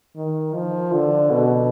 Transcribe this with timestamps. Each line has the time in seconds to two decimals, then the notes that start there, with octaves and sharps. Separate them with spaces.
0.16 D#3
0.54 F3
0.93 D3
1.31 B2